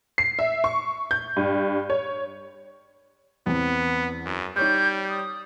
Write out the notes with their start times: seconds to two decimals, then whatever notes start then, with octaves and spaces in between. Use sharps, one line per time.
0.18 C7
0.39 E5
0.64 C#6
1.11 G6
1.36 G2
1.90 C#5
3.46 E2 B3 C4
4.25 F#2
4.56 G3 D#4 C#5 C#6 G6
5.09 D#6